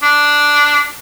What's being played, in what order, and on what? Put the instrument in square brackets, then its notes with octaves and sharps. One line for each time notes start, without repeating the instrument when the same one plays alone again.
[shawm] D4